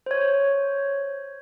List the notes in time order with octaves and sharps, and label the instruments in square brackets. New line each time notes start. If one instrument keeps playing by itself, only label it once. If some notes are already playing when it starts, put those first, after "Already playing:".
[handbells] C5 C#5